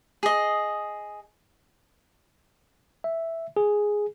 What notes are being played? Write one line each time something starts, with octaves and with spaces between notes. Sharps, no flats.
G#4 D#5
E5
G#4